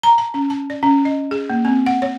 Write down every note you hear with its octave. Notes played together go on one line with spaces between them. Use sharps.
A#5
A5
C#4
A5
D5
C#4
D#5
G#4
A#3
C4
F#5
C#5